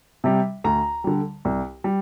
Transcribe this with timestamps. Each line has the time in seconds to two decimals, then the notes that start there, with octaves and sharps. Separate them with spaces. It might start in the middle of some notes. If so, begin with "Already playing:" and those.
0.24 C3 G3
0.64 D2 A#5
1.04 D3 G3
1.45 C2
1.84 G3